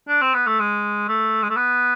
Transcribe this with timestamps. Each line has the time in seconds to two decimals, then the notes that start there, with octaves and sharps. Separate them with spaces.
0.08 D4
0.21 C4
0.34 B3
0.47 A3
0.60 G#3
1.08 A3
1.43 G#3
1.50 A3
1.56 B3